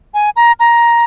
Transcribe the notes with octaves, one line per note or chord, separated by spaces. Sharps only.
G#5
A#5
A#5